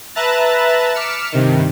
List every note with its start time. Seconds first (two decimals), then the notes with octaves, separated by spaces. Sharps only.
0.15 B4 E5 A5 A#5 F#6 A6
0.94 D6 F6 B6 C#7 E7
1.32 G2 C3 D#3